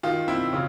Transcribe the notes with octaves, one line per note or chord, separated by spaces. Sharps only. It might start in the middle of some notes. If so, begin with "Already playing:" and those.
D#3 F4
C4 E4
C#3 F4